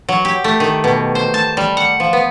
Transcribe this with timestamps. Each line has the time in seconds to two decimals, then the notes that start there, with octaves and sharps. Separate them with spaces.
0.09 F#3
0.25 G4
0.44 A3
0.60 D#3
0.84 B2
1.15 C5
1.34 A5
1.57 G3
1.77 F#5
2.00 F3
2.13 B3